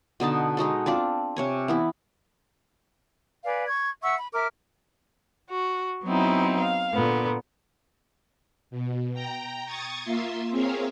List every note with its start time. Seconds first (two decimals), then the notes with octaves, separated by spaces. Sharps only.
0.20 B2 D3 D#4 A5
0.57 G#3 D#4 F#4 A4
0.86 C4 D4 F4 D5
1.36 C3 C#5 G#5
1.68 E3 B3 E4
3.45 B4 D5 F5 G#5
3.66 C#6 G#6
4.02 E5 F#5 C#6 E6
4.18 B5
4.33 A#4 E5 D6 F6
5.50 F#4
6.05 F#3 B3 C4 D#4 E4
6.59 F5
6.93 A#2 D3 B3
8.71 B2
9.14 G5 A#5
9.66 C#6 D#6 G#6 A6
10.04 A#3 F4 E5 C6
10.51 C4 G#4 A#4 C#5 E5 F5